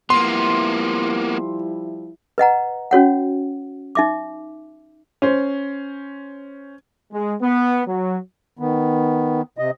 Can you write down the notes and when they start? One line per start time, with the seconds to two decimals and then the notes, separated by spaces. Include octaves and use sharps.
0.10 F3 G3 A#3 B3 E4 C6
2.38 B4 D#5 F#5 A#5
2.91 C#4 F#4 C#5 F#5
3.95 D#4 E5 D6
5.22 C#4 C5
7.12 G#3
7.42 B3
7.87 F#3
8.59 D#3 B3
9.58 C3 D#5